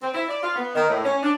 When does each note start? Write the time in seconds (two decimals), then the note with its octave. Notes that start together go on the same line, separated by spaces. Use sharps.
0.02 C4
0.13 E4
0.28 D5
0.42 F4
0.56 B3
0.74 D#3
0.88 A2
1.03 C#4
1.22 D4